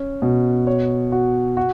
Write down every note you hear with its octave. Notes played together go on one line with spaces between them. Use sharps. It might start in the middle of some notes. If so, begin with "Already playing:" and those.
Already playing: C#4
B2
C#5
F#4
F#4